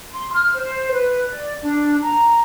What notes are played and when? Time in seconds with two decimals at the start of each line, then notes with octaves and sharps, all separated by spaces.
0.11 C6
0.31 F6
0.53 C5
0.92 B4
1.28 D5
1.61 D4
2.02 A#5